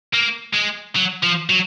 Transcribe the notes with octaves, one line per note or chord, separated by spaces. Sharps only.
A#3
G#3
F#3
F3
F#3